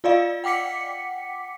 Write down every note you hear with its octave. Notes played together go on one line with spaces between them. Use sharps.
F4 D5 D#5 F5
F#5 G5 D6 B6 C#7